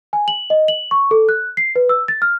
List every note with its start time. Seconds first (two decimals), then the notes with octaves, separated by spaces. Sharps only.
0.13 G#5
0.28 F#7
0.50 D#5
0.68 F#7
0.91 C#6
1.11 A4
1.29 F#6
1.57 C7
1.76 B4
1.89 E6
2.08 A6
2.22 F6